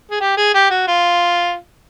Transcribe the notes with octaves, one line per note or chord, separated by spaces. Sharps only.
G#4
G4
G#4
G4
F#4
F4